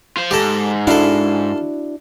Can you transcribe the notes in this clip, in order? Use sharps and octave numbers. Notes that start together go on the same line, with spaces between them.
F4 C5
G#2 G4 A4
D4 E4 F#4 A4 F5